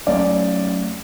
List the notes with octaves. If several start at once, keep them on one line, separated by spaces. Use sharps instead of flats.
F#3 A3 C#4 D5